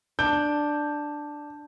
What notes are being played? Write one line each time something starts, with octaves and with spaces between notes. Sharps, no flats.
D4 G6